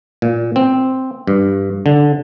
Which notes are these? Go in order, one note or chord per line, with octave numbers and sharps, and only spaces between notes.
A#2
C4
G2
D3